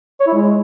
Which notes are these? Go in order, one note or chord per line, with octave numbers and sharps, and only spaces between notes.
C#5
E4
G#3